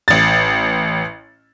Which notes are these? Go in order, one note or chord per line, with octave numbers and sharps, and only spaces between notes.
A1 A6